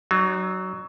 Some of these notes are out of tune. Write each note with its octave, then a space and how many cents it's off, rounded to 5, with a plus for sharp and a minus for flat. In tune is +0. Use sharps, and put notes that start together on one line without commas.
F#3 +15 D#4 -40